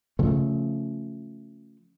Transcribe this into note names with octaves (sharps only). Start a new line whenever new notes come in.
C#3 F3 A3